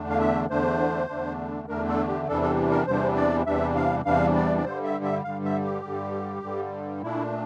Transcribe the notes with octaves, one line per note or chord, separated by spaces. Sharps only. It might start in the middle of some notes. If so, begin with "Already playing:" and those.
Already playing: E2 D3 A3 D4
F5
E5
E2 D3 A3 D4 C5
E2 D3 A3 D4
E2 D3 A3 D4 A#4
A4
G4
E2 C3 E3 G3 D4 A4
A4
A#4
E2 C3 E3 G3 D4 C5
D5
E2 C3 E3 G3 D4 E5
F5
E2 C3 E3 G3 D4 F5
D5
D5
G2 D3 G3 C5
E5
E5
G2 D3 G3 F5
E5
G4
G2 D3 G3
G2 D3 G3
A#2 A3 D4 E4